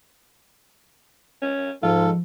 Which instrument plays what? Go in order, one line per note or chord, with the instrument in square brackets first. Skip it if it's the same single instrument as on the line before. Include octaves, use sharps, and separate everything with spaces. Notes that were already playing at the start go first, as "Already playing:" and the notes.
[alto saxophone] C#4
[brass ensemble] G#2 [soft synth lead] F3 [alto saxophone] F4 [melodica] A4